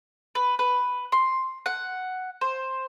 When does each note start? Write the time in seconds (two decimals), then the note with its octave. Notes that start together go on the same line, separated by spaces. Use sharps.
0.35 B4
0.59 B4
1.12 C6
1.66 F#5
2.41 C5